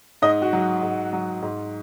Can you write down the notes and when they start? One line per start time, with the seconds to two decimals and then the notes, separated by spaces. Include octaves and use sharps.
0.22 G#2 D#5
0.42 F#4
0.53 F#3
0.83 G#2
1.13 F#3
1.42 G#2